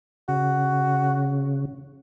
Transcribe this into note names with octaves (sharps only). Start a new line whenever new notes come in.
C#3 F#4